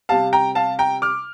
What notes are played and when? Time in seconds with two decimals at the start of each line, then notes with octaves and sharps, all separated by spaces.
0.09 C3 G3 F5 A5
0.33 G5 A#5
0.55 F5 A5
0.79 G5 A#5
1.02 D6 F6